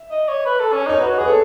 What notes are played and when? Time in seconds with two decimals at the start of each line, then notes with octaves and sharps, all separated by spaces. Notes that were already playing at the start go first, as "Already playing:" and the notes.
Already playing: E5
0.11 D#5
0.28 C#5
0.46 B4
0.60 A4
0.73 C#4
0.86 D#4 C#5
1.00 F#4 B4 D#5
1.18 G#4 B4
1.27 A4 C#5